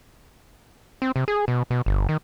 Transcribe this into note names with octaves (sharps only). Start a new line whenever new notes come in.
C4
C3
G#4
B2
B2
G1
D#3